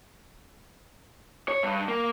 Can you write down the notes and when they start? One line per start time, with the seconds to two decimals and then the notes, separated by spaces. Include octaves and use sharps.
1.48 C#5
1.63 G2
1.88 A#3